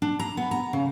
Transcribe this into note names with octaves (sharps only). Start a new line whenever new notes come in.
D4
A#5
B3
A#5
C#3